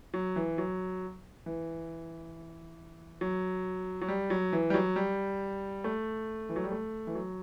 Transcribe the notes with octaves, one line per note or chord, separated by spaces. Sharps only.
F#3
E3
F#3
E3
F#3
F#3
G3
F#3
E3
G3
F#3
G3
A3
E3
F#3
G3
A3
E3
F#3